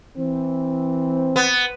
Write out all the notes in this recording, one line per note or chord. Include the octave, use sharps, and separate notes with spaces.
E3 C4
B3